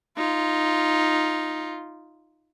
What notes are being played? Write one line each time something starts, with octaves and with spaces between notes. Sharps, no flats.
D#4 F4